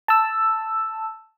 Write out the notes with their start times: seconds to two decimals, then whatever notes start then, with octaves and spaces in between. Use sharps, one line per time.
0.08 A5 E6